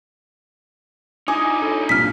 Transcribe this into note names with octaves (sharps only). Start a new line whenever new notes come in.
D#4 E4 G#4 D6
A4 C#5
C2 G2 A#2 F6 B6